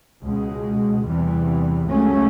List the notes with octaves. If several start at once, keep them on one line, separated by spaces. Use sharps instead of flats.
C#2 B2 G#3
E2 C3 E3 G3
C#2 C#3 F#3 A3 C#4